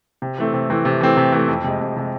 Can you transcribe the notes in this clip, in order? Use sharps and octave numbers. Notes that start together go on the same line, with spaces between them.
C3
E3 A3 C4
C3
E3 A3 C4
C3
E3 A3 C4
C3
E3 A3 C4
F2
C3 G#3
F2
C3 G#3